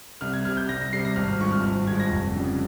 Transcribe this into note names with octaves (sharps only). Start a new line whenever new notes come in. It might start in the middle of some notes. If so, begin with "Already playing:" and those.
C2 F6
G#6
C3 G3 F6
G6
C2 A#6
A#6
C3 G3 C7
A#6
G#1 F6
F6
G2 F3 G#3 C#6
F6
G#1 F6
G2 F3 G#3 G#6
A#6
F1
F2 C#3 G3